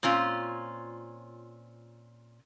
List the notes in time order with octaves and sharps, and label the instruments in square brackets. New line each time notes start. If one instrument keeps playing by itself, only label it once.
[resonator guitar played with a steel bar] A#2 C4 C#4 F4